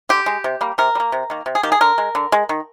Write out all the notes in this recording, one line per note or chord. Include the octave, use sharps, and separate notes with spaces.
D3 G4
G#3
C3
G3 A#3
C3 A#4
G3
A#3
C3
D#3 A#3
C3
G#4
D#3 A#3 G4
G#4
D3 A#4
G#3
D3
G#3
D#3